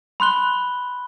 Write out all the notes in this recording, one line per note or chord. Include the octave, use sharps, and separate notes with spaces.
B5 C6 F#6 G7